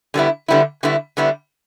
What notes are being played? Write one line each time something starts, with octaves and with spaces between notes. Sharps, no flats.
D3 G3 B3 E4
D3 G3 B3 E4
D3 G3 B3 E4
D3 G3 B3 E4